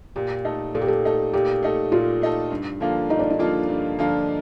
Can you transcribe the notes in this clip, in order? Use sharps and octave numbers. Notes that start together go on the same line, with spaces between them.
A#2 G4
A3 D#4 A4
A#2 A4
G4
A4
A3 D#4 A4
A#2 G4
A3 D#4 A4
A#2 F4
A3 D#4 A4
G2
D3 F3 A#3 F4
G2 D#4
D4
D#4
D3 F3 A#3 F4
G2
D3 F3 A#3 F4